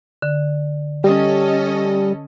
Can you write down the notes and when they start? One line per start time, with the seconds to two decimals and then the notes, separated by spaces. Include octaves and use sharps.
0.22 D3
1.04 G3 C#4 A4 D#5